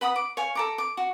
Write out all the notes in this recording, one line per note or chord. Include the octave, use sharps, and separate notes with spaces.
B4 F#5 B5 D#6
D6
C#5 F5 G#5
A4 A#5 D6
D6
F#4